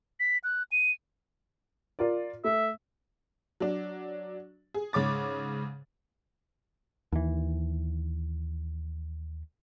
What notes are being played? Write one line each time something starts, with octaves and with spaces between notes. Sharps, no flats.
B6
F#6
D#7
F4 A#4 D5
A3 E5
F#3 D4
G#4
G#2 C#3 C#5 D6 A6
D#2 E3